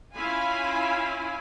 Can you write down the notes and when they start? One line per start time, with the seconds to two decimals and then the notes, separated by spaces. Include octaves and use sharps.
0.14 C#4 E4 F4 F5 G#5 B5